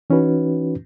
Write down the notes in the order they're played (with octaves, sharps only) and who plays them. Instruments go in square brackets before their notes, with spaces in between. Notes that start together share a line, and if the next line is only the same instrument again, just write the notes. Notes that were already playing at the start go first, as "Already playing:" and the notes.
[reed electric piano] E3 C#4 D#4 F#4 B4